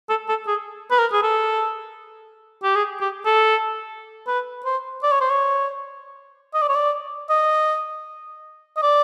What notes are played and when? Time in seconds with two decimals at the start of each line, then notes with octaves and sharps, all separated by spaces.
0.09 A4
0.29 A4
0.47 G#4
0.91 B4
0.99 A#4
1.12 G#4
1.23 A4
2.63 G4
2.75 G#4
3.01 G4
3.26 A4
4.27 B4
4.65 C5
5.03 D5
5.11 C#5
5.21 C5
5.30 C#5
6.54 D#5
6.62 D5
6.69 C#5
6.75 D5
7.30 D#5
8.77 D#5
8.82 D5